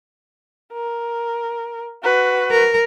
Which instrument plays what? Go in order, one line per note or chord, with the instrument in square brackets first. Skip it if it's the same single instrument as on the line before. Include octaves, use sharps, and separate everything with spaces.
[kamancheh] A#4
F#4 B4
[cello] A#4